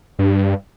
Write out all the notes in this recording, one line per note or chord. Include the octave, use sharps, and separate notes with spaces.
G2